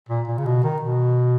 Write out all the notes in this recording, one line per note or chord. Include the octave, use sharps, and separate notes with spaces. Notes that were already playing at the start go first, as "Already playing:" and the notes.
A#2
A#2
C#3
B2
D#3
B2